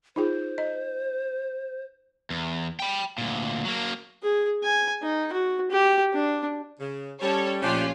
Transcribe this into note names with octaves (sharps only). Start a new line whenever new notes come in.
D#4 F4 G#4 C5
D#5
E2
G5 B5
D2 A#2
F#3 A#3
G#4
G#5
D#4
F#4
G4
D4
C#3
G3 C#4 A4 C#5
A#1 A3 C#4 D4 F4 G4